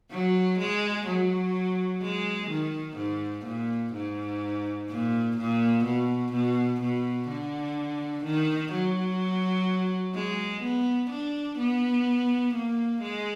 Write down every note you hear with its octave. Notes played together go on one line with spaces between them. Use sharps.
F#3
G#3
F#3
G#3
D#3
G#2
A#2
G#2
A#2
A#2
B2
B2
B2
D3
D#3
F#3
G#3
B3
D4
B3
A#3
G#3